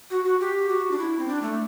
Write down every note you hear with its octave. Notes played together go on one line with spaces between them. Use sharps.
F#4
F#4
G4
F#4
D4
E4
C4
D4
A3